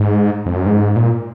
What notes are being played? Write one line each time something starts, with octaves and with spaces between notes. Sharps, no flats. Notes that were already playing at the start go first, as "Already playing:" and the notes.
Already playing: G#2
F2
F#2
G#2
A#2